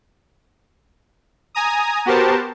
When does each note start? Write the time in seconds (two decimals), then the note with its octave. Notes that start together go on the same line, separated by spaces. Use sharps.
1.55 G#5 A#5 D#6
2.06 B3 F#4 G4 A#4 C5 A5